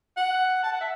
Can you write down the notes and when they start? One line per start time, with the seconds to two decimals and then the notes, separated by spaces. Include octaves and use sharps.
0.17 F#5
0.63 A5
0.72 F#5
0.81 E5